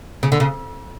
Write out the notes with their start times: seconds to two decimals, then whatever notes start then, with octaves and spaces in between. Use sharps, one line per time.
0.23 C#3
0.32 D3
0.40 C#3